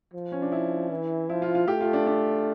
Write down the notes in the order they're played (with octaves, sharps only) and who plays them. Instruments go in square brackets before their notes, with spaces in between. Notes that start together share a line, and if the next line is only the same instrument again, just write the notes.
[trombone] F3
[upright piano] C#4
D4
E4
[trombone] E3
[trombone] F3 [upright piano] E4
[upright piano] F4
F4
[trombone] A3 [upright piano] G4
[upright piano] F4
D4
D4